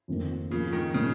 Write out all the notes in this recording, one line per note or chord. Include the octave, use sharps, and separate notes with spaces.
F2 D#3 A#3
C#3 F3 A#3 F4
D#3
A#2 C#3 F3 A#3 D#4